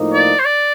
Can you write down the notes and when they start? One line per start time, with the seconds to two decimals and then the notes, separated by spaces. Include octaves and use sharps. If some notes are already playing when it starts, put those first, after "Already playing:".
Already playing: A2 F3 A#3 D#4
0.14 D5
0.39 C5
0.45 D5